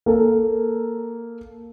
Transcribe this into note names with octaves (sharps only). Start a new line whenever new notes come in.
A#3 A4